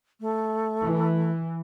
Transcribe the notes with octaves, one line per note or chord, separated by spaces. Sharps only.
A3
E3